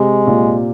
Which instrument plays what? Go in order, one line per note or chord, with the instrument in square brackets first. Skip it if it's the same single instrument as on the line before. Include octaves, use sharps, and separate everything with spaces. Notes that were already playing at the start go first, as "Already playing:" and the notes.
Already playing: [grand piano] C3 [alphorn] G#3
[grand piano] A#2